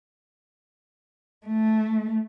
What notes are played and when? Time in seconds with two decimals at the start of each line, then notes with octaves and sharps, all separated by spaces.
1.46 A3